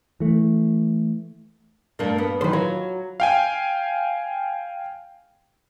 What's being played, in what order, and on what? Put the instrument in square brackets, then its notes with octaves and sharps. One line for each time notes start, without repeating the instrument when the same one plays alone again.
[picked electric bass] E3 A3
[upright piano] G2 D4 [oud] A3 A#3
[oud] B3
[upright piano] D#3 E3 F#3 [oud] B4 C5
[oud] F#3 [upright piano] F4
[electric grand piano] F5 G5 G#5